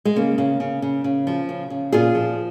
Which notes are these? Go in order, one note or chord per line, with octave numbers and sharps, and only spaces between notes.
G#3
C#3 A#3
C#3
C#3
C#3
C#3
F3
C#3
C#3
A#2 F4 G#4
F3